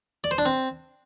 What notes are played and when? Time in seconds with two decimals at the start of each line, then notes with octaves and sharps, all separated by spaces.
0.24 D5
0.31 C5
0.38 D4
0.46 C4